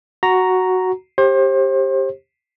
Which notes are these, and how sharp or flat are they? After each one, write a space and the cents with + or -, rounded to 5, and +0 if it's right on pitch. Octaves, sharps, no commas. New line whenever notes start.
F#4 +0 A#5 +0
G4 +5 C5 +35